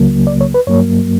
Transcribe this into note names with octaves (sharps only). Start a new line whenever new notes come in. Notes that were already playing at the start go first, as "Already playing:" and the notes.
Already playing: C#2 C#3 F#3 A#3
D5
C#5
B4
G2 F#3 A#3 C#5